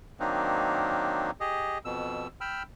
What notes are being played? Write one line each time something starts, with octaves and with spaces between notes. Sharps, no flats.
D#3 F#3 A#3 C4 D4 D#4
G4 G#4 D#5
F2 B2 E6
G5 B5 E6 F6